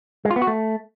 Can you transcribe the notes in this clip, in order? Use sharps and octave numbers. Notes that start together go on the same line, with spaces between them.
G#3
F4
B3
F#4
A3